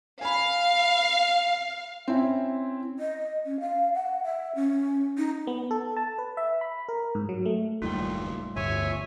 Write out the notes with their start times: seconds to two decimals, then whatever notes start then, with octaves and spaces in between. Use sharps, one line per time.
0.21 F5 G#5 B5
2.08 C4 C#4 E4
2.99 D#5
3.45 C#4
3.60 F5
3.94 F#5
4.24 E5
4.55 C#4
5.18 D#4
5.47 B3
5.71 A4
5.96 A5
6.18 B4
6.37 E5
6.61 B5
6.89 A#4
7.15 G#2
7.29 F#3
7.45 A3
7.82 F#1 D#2 A2 D#3 G3 F4 G5
8.56 G1 D2 C#5 E5 G#5